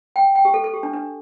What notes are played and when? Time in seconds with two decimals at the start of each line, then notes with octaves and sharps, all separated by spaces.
0.16 G5
0.35 G5
0.45 G4
0.54 A4
0.64 A4
0.74 G4
0.83 D4
0.93 D4